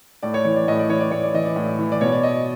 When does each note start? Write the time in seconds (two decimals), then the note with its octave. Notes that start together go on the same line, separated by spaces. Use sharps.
0.23 A2 D5
0.34 C#5
0.45 E3 C#5
0.56 D5
0.68 A2 D#5
0.79 D5
0.89 E3 C#5
1.00 D5
1.11 A2 C#5
1.23 D5
1.34 E3 D#5
1.46 D5
1.56 A2
1.79 E3
1.92 D5
2.01 B2 C#5
2.12 D5
2.23 D#5